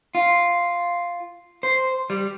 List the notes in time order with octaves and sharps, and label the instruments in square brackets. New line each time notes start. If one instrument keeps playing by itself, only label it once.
[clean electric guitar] F4
C5
G3